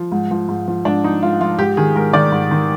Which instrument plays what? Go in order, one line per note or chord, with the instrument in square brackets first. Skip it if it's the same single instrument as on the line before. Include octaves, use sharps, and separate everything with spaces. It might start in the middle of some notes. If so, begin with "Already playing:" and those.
Already playing: [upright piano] F3
G#2
F3
G#2
F3
G#2 D4
F3 D#4
G#2 F4
F3 F4
G#2 G4
D#3 G#4
G#2 A#4
D#3 D5
G#2
D#3